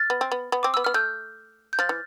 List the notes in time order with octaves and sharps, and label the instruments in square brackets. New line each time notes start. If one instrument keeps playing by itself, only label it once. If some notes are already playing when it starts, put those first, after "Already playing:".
Already playing: [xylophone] F6 A6
[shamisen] B3
C4
B3
B3
[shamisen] C4 [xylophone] D6
[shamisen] B3 [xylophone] E6
[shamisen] B3 [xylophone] F6
[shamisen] A3 [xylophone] E6 G6
[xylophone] G6
[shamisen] F3 [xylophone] F6 A6
[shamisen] E3